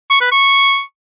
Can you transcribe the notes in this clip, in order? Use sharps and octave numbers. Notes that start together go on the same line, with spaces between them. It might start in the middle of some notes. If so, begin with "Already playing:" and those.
C#6
B4
C#6